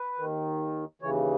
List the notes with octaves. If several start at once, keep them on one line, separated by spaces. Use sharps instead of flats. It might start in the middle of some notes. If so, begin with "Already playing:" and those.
Already playing: B4
D#2 D#3
D#2 C#3 E3 C#5